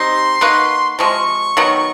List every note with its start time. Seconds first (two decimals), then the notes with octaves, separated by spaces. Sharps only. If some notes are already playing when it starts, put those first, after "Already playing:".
Already playing: G3 C4 D#4 C6
0.41 A#3 D#4 F#4 B4
0.99 C3 F3 G#3 C#6
1.57 D#3 F#3 B3